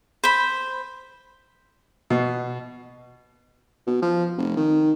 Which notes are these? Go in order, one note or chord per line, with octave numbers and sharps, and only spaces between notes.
C5 B5
B2
B2
F3
F1
D#3